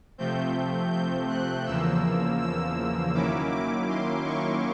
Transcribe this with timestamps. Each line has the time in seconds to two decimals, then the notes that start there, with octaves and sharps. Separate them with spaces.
0.18 C3 F3 A3 C4 G6
0.92 G6
1.29 F#6
1.66 E2 C#3 F3 A#3 E6
2.40 E6
3.14 D#3 F#3 A#3 C#4 E4 D6
3.51 D6
3.89 C6
4.26 C#6